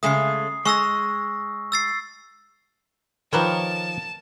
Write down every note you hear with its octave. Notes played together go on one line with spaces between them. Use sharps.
C#3 G#3 A3 D#6 C7
G#3 C#6 E6 A#6
E6 A6 C7
D#3 F3 G4 A#4 B4 C#5 A5